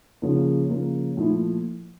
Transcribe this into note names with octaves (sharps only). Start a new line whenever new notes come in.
C#3 F3 A#3
C#3 F3 A#3
A#2 F3 A3 E4